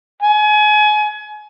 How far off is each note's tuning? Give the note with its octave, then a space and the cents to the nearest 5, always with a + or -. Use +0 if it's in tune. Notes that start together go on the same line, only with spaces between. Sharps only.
G#5 +30